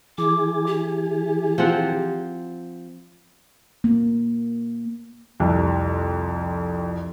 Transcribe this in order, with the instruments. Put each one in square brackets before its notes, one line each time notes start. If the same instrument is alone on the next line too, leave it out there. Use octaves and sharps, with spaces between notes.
[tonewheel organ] E3 G#4 [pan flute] D6
[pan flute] G4
[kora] F3 C4 F#5
[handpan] A#3
[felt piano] C2 F2